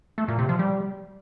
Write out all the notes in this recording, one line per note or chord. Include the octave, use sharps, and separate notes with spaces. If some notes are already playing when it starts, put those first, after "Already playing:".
A3
A#2
C3
F3
G3